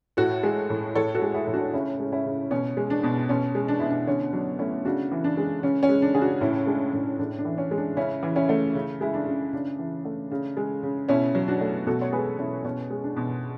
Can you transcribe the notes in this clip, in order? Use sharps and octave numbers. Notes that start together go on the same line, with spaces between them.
A2 F#4 A4
G#3
A2
A2 A4 C#5
F#4 A4
G#3
E4 G#4
A2
D4 F#4
C#3 C#4 E4
G#3
C#4 E4
C#3
B2 C#4
G#3
D4
B2
B2 C#4
G#3
D4
B2 E4
D4
D3 C#4
F#3 D4
A3 C#4 E4
C#3 D4 F#4
E3
D4
G#3
C#3 C#4
C#4
G#3
D4
C#3 G#4
D4 F#4
A2 C#4 E4
G#3 D4
A2 D4
A2 D4
D4
E3
C#4
G#3
D4
C#3 C#4 E4
E3
C#4 E4
A3
C#3
G#3 E4
D4
C#3
C#3 D4
E3
A3
C#3
G#3
C#3
B2 C#4 E4
F#3
D4 F#4
A3
B2 F#4 A4
C#5
G#3 G#4 B4
B2 C#4 E4
B2 C#4
G#3
D4
B2